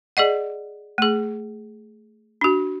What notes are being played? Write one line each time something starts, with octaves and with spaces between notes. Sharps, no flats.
G#4 D5 D#5 F#5
A3 G#4
D4 F#4